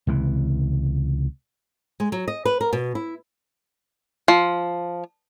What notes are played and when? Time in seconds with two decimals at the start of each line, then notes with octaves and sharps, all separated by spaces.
0.07 C#2 C3 E3
2.00 G#3
2.12 F#3
2.28 D#5
2.45 B4
2.61 A#4
2.73 B2
2.95 E4
4.28 F3